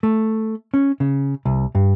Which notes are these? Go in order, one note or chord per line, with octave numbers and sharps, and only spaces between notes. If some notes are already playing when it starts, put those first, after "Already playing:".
A3
C#4
C#3
C2
G2